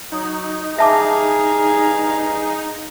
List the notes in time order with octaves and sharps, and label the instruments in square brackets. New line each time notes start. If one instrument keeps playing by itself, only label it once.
[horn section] F#3 [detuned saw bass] D#4
[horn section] G2 F5 A#5 [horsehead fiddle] G#4 [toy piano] E5 A5 D6